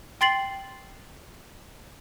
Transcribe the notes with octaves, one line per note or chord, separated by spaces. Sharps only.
G5 C6 A6 C7 F#7